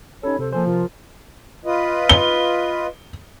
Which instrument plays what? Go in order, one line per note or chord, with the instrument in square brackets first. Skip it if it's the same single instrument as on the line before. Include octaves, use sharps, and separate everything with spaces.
[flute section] C#4 C#5 B5 [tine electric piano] D#4 G4 A4
[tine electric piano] C3 [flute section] A4 C5
[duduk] F3 [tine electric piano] A#3 A4 C5 [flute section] G#5
[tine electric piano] C3 [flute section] F4 A#4
[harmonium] F4 B4 D#5
[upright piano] G7